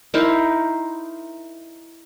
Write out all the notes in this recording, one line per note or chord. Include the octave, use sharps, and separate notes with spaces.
D#4 E4 A#4 C5